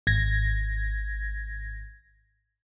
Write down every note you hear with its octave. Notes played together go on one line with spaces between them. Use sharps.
G#1 G#6 A#6